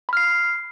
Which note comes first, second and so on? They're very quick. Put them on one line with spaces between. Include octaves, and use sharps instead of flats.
B5 F6 C7